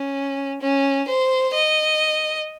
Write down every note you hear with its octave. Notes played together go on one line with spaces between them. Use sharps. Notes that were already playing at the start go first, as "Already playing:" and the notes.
Already playing: C#4
C#4
C5
D#5